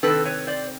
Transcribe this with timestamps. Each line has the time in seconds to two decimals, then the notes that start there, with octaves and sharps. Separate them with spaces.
0.03 C3 D#3 G3 C4 A4 B4
0.25 B4 C#5
0.47 C5 D5